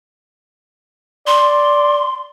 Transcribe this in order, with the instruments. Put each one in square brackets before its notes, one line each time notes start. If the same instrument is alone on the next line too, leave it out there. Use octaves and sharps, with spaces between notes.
[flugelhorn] D5 [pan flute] C6